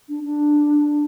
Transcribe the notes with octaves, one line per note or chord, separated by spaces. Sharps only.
D4
D4